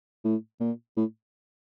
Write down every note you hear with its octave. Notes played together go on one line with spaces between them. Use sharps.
A2
A#2
A2